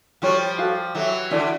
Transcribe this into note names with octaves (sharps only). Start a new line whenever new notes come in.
F3 G3 F#4 A4 C#5
F#4 A4 C#5 F5
E3 F#3 A4 C#5 E5 G5
D3 E3 E4 A4 D5